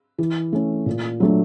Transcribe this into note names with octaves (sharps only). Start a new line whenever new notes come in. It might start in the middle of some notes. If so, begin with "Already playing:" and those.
E3
A3 C#4
A#2
F#3 A3 D4